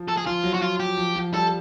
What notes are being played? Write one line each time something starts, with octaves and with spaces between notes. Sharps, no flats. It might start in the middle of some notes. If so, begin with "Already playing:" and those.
Already playing: F3
A4
G#4
F3 F4
F#3
F#4
F4
G4
F3
F3
G3 A4